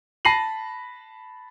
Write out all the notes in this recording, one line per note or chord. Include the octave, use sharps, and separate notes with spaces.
A5 B5 A#6 C7 D#7 F#7